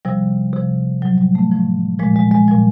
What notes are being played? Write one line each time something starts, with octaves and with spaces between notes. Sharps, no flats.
C3 F3 G3
C3 F3
A2 F3 F#3
G3
A3
A2 F3
A#2 F3 G#3
G#3
G#3
A#2 F3 G3